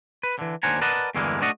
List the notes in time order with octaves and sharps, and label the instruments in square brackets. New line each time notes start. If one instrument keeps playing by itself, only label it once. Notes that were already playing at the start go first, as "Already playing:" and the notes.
[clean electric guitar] B4
D3 E3
D#2 D4 C5 F#5 G#5 A#5
A#4 B4 D5 D#5 F#5 A5
E2 G2 D3 E3 G#3 A#3
A3 D4 F#4 D5 D#5 F#5